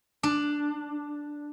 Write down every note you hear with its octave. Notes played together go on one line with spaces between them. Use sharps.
D4